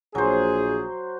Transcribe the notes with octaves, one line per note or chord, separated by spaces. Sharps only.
A#1 F#3 G#4 C5